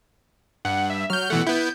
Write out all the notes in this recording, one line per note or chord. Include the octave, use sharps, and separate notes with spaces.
G2 F#5
E5
F#3 F6 G6
B2 E3 A3 F#5
B3 E4 G6